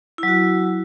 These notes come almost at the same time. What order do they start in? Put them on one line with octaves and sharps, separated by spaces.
E4 F#3 F#4